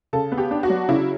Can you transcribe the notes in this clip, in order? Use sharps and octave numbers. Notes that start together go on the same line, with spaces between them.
C#3 A4
B3
G4
D4
F#4
F#3
C#3 E4